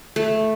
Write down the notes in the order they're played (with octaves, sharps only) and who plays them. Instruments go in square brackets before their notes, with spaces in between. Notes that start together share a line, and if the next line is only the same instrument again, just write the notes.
[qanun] A3